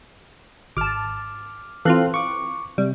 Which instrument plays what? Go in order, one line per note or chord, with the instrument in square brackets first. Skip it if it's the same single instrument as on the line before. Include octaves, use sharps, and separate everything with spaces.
[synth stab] G#1 A5 [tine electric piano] D6 F6
[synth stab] E3 C4 F4 [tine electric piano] A4 F5 F#6
[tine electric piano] C#6 D6
[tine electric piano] C3 [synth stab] G3